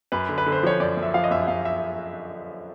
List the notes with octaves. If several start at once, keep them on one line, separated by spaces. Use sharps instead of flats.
F#2 B4
D3
B4
D3
C5
F3 C#5
F#2 D5
F#2
E5
F3 F5
D#5
F#2 E5
F#2 F5
E5